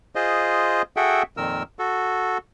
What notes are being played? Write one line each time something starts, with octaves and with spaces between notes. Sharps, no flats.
F4 G#4 C5 D#5
F#4 G#4 A4 E5 F#5 G5
F2 A#2 D#3 A#4 E6
F#4 A4